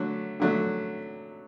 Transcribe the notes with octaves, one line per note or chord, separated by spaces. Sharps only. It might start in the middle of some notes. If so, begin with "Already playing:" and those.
Already playing: D3 F#3 A3
D3 F#3 A3